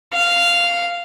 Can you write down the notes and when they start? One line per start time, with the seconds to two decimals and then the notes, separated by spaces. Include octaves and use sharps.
0.13 F5